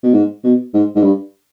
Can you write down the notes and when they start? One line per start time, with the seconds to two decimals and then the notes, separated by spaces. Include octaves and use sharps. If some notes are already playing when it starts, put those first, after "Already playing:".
0.03 B2
0.14 G#2
0.44 B2
0.74 G#2
0.95 G#2
1.03 G2